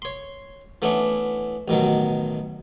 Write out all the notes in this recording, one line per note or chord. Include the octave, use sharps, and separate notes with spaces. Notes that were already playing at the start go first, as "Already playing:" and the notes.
C#5 C6
E3 A3 B3 C#4 D4 E4
A1 B2 D#3 F#3